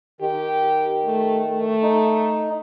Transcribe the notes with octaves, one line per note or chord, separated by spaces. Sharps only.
D#3 G4
A3
A3
D#4